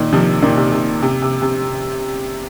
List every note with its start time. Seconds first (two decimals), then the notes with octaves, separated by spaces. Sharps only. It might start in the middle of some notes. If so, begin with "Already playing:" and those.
Already playing: A#2 D#3
0.13 C3 F3
0.42 A#2 D#3
0.57 C3
0.72 C3
1.02 C3
1.22 C3
1.42 C3